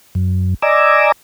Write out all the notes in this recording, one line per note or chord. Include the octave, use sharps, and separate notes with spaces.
F#2
D5 D#5 G#5 A#5 D6 E6